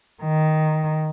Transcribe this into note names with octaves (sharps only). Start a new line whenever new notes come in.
D#3